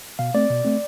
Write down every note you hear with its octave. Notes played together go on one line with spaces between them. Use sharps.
B2 F5
A3 C4 D5
B2
A3 C4